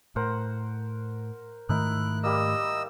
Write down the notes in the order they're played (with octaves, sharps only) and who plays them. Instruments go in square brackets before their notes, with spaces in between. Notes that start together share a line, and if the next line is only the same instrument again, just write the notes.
[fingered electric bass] A2 [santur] A#4 C5 F#5
[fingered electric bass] G#2 D#3 A3 [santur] D#4 E4 A#4 [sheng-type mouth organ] F#6
[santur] G3 A#3 [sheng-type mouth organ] D#5 E6